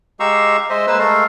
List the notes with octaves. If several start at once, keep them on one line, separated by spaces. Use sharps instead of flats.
G#3 G4 F5 A#5 C#6 E6
G#3 C5 D#5 E5
G#3 A#3 B4 C5 E6
G#3 A3 A4 A#4 F5